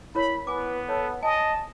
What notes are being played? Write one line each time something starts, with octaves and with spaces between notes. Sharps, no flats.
E4 A#4 C#5 B5
B3 B4 G#5 D6
A4 C#5
D#5 G#5 A5